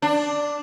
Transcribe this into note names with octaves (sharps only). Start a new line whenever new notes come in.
D4